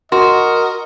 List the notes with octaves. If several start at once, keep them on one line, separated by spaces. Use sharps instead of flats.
F#4 A#4 D#5 C6